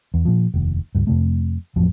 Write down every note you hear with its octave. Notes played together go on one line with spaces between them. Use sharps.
E2
A#2 F3
F1 D#2
C#2 G2
F2 C3 A3
A1 F2 F3 F#3